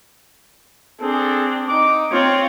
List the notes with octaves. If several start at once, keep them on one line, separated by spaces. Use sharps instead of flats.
C4 D4 G#4 A4
D#4 D6
C4 F4 C#5